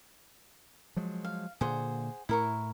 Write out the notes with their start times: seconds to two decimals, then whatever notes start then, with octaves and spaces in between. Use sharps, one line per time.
0.96 F3 F#3 G#3
1.25 F5
1.61 A#2 D3 G#4 C5 F#5
2.29 A2 E4 A#4 C#6